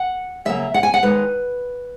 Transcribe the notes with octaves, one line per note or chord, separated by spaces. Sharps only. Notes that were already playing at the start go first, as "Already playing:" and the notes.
Already playing: F#5
C#3 F#3 A#3 E5
F#5
G#5
F#5
D#2 D#3 G#3 D#4 B4